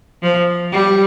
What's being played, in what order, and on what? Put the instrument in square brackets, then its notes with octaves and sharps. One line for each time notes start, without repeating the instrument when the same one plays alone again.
[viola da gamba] F3
G3